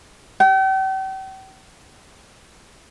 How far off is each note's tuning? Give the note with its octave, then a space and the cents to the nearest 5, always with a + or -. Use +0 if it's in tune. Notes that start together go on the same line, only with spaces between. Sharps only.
G5 -40